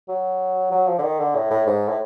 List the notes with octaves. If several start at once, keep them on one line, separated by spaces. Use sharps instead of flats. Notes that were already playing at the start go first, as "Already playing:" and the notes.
F#3
F#3
F3
D3
D#3
D3
A2
A2
G#2
A2